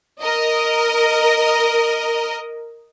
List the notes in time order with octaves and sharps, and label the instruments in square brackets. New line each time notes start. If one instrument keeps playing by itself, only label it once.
[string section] A#4 D#5